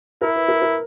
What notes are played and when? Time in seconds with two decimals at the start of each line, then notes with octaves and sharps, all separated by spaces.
0.21 E4 A#4
0.36 B4
0.49 A#4
0.62 A#4